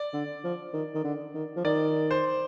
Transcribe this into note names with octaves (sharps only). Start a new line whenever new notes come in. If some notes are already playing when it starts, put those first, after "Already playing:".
Already playing: D5
D3
F3
D#3
D#3
D3
D#3
F3
D#3 D5
C5